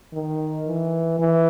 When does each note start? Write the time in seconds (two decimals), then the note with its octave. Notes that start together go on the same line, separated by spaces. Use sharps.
0.13 D#3
0.67 E3
1.19 E3